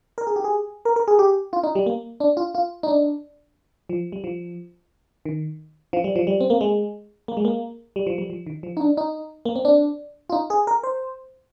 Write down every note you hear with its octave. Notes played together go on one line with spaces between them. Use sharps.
A#4
G#4
G4
G#4
A#4
A#4
G#4
G4
F4
D#4
G3
A#3
D4
F4
F4
D#4
D4
F3
G3
F3
D#3
F3
G3
F3
G3
C4
A#3
G#3
A#3
G#3
A#3
G3
F3
G3
F3
D#3
F3
D#4
D4
D#4
A#3
C4
D4
F4
D#4
G#4
A#4
C5